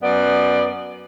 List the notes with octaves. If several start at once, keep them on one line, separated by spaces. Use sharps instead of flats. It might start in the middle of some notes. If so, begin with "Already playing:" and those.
F#2 B3 D5